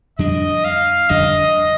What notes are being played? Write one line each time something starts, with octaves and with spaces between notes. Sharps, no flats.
F2 D3 G3 D4 D#5
F5
F2 D3 G3 D4 D#5